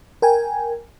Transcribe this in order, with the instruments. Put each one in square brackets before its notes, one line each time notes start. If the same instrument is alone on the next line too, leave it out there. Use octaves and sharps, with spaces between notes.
[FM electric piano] A#4 G5 G#5